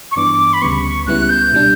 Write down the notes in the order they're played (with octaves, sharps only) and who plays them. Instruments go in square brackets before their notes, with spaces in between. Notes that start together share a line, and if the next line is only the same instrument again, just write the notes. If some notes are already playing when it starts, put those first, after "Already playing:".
[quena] C#6
[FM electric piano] G2 E3 B3 D4 [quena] D6
[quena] B5
[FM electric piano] D2 C#3 G3 B3 [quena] C#6
[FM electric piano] C#2 C#3 G3 B3 E4 [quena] F#6
[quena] G6
[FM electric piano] B2 G3 D4